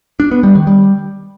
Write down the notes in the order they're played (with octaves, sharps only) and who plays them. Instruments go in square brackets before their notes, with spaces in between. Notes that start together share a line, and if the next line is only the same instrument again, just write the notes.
[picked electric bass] D4
B3
G3
D#3
G3